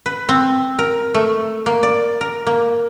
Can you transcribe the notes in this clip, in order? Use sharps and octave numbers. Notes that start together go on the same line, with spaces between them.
B4
C4
A#4
A3
A#3
D5
A#4
A#3